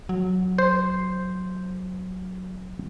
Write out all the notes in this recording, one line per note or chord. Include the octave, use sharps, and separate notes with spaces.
F#3
C5